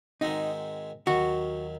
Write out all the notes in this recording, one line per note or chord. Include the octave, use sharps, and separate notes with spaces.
G#2 D#3 G#3 C4 D#4 F#4
D#2 D#3 F#3 F#4